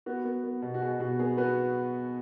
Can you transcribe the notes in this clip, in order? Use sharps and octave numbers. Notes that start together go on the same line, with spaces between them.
B3 F#4
B3
B3
B2
F#4
B2 G#4
B2 F#4
B3 G#4
B3 F#4 B4